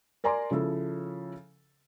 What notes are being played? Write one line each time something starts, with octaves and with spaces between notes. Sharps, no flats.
A#4 D5 G#5 A#5 C6
C#3 F3 E4 A4